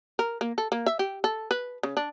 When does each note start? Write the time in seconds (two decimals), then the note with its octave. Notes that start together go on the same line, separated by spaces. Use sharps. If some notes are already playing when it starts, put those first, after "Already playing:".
0.19 A#4
0.41 A#3
0.58 A4
0.72 A#3
0.86 E5
0.99 G4
1.24 A4
1.51 B4
1.83 C#3
1.97 D4